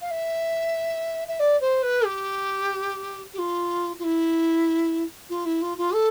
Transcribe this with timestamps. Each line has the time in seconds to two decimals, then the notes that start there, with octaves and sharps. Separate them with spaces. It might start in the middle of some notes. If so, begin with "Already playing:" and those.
0.01 F5
0.11 E5
1.28 E5
1.39 D5
1.61 C5
1.83 B4
2.05 G4
3.34 G4
3.38 F4
3.99 F4
4.04 E4
5.29 F4
5.45 E4
5.62 F4
5.77 F4
5.94 A4